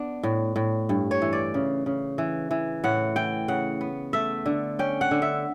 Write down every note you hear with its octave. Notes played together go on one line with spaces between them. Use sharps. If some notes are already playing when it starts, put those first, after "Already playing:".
Already playing: B3 D4
A2
A2
G2
C#5
E3
D5
C#3
C#3
E3
E3
A2 F#5
E3 G5
C#3 F#5
B3
A3 E5
D3
C#4 G5
F#5
D3
E5